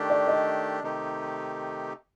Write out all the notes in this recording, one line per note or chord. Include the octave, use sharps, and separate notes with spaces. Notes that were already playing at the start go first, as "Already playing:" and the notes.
Already playing: D#3 A3 D4 G4
D5
D#5
C3 D#3 A3 D#4 G4